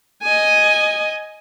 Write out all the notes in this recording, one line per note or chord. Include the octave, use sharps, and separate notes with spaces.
D#5 G#5